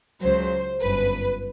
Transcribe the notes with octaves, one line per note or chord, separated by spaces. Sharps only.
C#2 C#3 F#3 C5
G1 F#2 B4